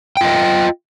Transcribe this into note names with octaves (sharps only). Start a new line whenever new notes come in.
F4 D#5 G5